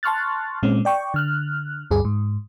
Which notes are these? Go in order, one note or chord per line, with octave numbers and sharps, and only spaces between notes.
A5 C6 C#6 F6 F#6 A6
A#2 G#3 C4 C#4
D5 G5 C#6
D3 F6 F#6
D2 G2 G#4
G#2